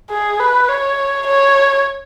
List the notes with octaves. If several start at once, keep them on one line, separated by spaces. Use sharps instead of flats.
G#4
B4
C#5
C#5